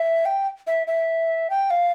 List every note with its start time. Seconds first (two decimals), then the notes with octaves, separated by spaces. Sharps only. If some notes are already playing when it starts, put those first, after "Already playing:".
Already playing: E5
0.25 G5
0.67 E5
0.87 E5
1.50 G5
1.70 F5